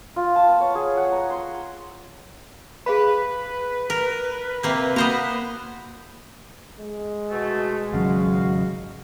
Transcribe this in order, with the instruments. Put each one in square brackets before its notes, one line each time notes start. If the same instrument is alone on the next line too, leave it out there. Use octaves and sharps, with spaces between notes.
[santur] F4
A5
B3
C#5
G#4
F#5
A#5
C6
[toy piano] G#4 F5 B5 [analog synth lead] B4
[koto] A#4
C3 A#3 C4
[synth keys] A#3 [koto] B3 C5 A#5 [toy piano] F#4
[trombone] G#3
[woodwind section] B2 A3
[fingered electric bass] G#1 C#3 F#3 [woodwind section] F#4 F5